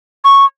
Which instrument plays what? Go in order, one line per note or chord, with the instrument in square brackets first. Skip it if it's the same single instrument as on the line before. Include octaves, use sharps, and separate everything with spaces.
[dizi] C#6